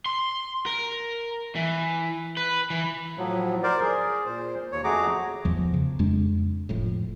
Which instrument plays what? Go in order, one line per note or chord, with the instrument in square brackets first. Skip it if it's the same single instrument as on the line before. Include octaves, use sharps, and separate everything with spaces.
[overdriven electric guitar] C6
A#4
E3
B4
E3
[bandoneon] A2 F3 F#3
A#4 C5 D5
G#4
A#2 C5
D#2 C#5
F2 A3 F#4 G#4 A#5 D6
[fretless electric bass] E2 F3
C#3
F2 G#3 D4
F1 F2 A2